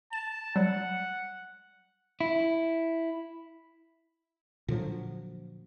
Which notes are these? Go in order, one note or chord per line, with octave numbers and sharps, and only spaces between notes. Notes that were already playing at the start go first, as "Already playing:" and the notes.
A5 E7
F#3 G3 F#5
E4
A#2 D3 F3 F#3